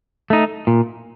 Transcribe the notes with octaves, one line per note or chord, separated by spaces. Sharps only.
A3 D#4
A#2